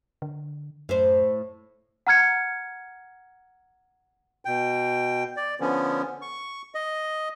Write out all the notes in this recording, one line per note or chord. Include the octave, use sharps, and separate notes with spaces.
D3
F#2 A2 C5
F#5 A#5 F6 G#6 C#7
B2 G5
D5
D3 F3 B3 C#4
C#6
D#5